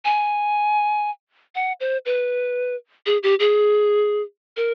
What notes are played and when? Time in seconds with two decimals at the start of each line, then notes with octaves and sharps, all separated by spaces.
0.05 G#5
1.55 F#5
1.80 C5
2.05 B4
3.06 G#4
3.23 G4
3.40 G#4
4.57 A#4